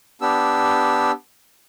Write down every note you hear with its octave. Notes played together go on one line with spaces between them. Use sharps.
B3 D4 G4 E6